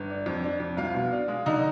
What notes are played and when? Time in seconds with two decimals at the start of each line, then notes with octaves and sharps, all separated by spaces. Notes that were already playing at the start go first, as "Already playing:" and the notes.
Already playing: G1
0.10 D4
0.26 F2
0.44 D4
0.60 F2
0.77 C2 F4 F5
0.94 B2
1.11 D4
1.28 G#3
1.46 D3 D#4 D#5